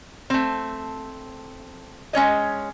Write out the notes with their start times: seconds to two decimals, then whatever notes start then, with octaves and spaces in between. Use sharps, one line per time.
0.30 A3 C4
2.13 G#3 C#4 C#5 D#5